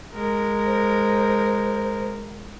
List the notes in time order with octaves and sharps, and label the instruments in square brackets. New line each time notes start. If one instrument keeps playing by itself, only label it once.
[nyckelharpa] G#3 A#4
[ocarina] C5